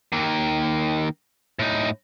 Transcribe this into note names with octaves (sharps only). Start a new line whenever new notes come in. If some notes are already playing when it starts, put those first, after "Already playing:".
D#3 A#3
A2 D#4